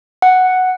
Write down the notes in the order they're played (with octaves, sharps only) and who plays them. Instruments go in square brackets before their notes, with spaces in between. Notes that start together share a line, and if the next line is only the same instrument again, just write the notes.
[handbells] F#5